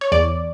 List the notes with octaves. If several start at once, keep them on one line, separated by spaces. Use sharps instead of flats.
C#5
E2 D5